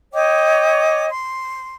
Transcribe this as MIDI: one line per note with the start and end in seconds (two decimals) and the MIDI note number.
0.13 1.09 73
0.13 1.09 75
0.13 1.09 79
0.13 1.09 86
1.09 1.76 84